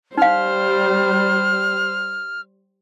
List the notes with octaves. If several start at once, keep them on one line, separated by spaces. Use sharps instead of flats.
G3 D#4 C5 F5 F6